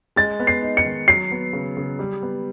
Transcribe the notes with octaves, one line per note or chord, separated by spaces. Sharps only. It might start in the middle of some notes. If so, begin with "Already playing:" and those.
G#3 A6
B3
C7
D#4
C#7
D#3
F#3 C7
B3
C#3
C#3
G3
B3